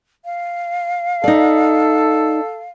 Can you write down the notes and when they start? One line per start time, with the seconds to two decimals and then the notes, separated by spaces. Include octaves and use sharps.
0.25 F5
1.24 D#4 A4 D5